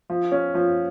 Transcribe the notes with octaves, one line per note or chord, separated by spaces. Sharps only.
F3
C#4
F3